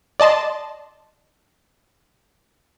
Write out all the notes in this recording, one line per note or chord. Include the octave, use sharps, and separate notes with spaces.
D5 D#5 A5 C6